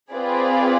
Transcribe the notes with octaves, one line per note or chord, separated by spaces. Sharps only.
C4 F4 G#4 B4 D5